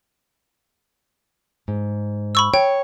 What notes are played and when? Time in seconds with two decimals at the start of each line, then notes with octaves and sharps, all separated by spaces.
1.68 G#2
2.35 B5 C#6 E6
2.54 C#5 G5